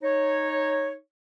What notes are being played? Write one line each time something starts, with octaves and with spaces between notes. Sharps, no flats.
D#4 C#5